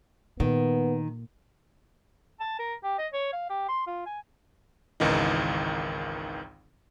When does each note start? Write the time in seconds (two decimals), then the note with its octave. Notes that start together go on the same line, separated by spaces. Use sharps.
0.40 A#2 D#3 B3
2.40 A5
2.59 A#4
2.84 G4
2.99 D#5
3.12 C#5
3.33 F5
3.50 G4
3.68 C6
3.87 F4
4.06 G#5
5.00 G#1 C#2 D#3 E3 D#4